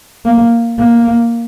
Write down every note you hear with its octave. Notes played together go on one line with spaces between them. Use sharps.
A#3
A#3